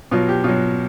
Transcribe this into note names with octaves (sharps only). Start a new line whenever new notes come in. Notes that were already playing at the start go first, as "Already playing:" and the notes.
B2 F#3 F4
G4
B2 F#3 F4